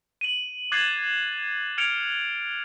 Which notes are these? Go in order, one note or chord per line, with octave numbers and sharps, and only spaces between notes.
D#7 F#7
D6 F#6 G#6 A6 C7 F#7
F6 G#6 C#7 D7 F7